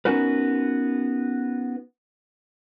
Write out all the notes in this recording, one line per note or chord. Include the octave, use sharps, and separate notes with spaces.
B3 C#4 D#4 F#4 A#4 B4